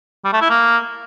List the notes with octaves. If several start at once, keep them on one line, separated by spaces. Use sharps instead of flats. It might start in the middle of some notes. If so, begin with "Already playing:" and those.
G3
A3
E4
A#3